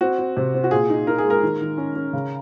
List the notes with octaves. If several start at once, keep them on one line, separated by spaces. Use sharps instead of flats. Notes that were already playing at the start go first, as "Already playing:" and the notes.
C4 F#4
C4
C3
C4
F#4
A#2 G#4
D#4
D#4 A#4
G#4
G#3
A#4
D#3
D#3
C#4
C#4
C#3